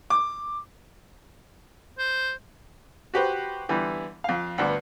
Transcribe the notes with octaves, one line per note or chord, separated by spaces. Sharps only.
D6
C5
F#4 G4 B4 C5
D3 E3 G3 B3
F2 F5
D2 G2 B3 D6